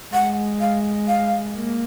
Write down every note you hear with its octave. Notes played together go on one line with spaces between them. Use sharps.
G#3 F#5
F5
F5
A#3